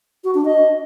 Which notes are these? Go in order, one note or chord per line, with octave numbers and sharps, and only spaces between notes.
F#4
D4
D#5